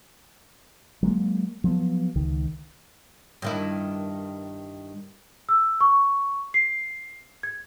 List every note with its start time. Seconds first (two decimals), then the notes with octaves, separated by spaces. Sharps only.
1.03 F#3 G#3 A#3
1.64 F3 F#3 A#3 B3
2.16 C#2 D#3
3.42 G2 D#3 E4
5.49 E6
5.81 C#6
6.54 C7
7.43 G#6